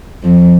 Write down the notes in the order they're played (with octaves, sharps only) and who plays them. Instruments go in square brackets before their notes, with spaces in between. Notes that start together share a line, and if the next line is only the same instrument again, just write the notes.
[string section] F2